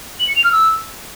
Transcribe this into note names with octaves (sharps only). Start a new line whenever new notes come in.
F#7
C#7
F7
F6
E6